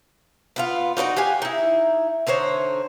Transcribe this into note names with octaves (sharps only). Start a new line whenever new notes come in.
B3 E4 F4
D#4 F#4 B4 D5
G4 F5 F#5 G#5
D#4 E4
D3 D#4 C5 C#5